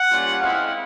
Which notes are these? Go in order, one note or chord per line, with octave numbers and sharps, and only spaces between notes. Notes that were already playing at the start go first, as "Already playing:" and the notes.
Already playing: F#5
G3 A#3 C#4 F4
G#3 C4 E4 F5